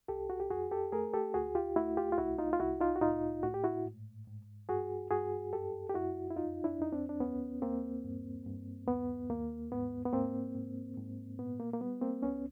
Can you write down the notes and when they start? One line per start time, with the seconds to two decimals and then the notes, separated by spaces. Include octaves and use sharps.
0.08 C2 G4 A4
0.30 F#4
0.40 G4
0.50 F2 F#4 G#4
0.71 G4 A4
0.92 A3 G#4 A#4
1.14 G4 A4
1.34 D2 F#4 G#4
1.55 F4 G4
1.76 A3 E4 F#4
1.97 F4 G4
2.12 F4
2.18 C2 E4 F#4
2.38 D#4 F4
2.53 F4
2.60 C2 E4 F#4
2.80 D#4 F4
2.96 F#4
3.01 A2 D#4 F4
3.43 A2 F#4
3.54 G4
3.64 E4 F#4
3.86 G#2
4.27 G#2
4.69 G2 F#4 G#4
5.10 G2 F#4 G#4
5.53 F#2 G4 A4
5.89 G4
5.94 F#2 E4 F#4
6.30 E4
6.36 F2 D#4 F4
6.64 D4 E4
6.78 F2 D#4
6.92 C4 D4
7.09 D4
7.20 D#2 B3 C#4
7.62 D#2 A#3 C4
8.04 G2
8.46 G2
8.88 D#2 B3
9.30 D#2 A#3
9.72 G#2 B3
10.06 B3
10.13 G#2 A#3 C4
10.55 G#2
10.97 G#2
11.39 A#2 B3
11.60 A#3
11.73 A#3
11.81 G3 B3
12.02 A#3 C4
12.22 C#2 B3 C#4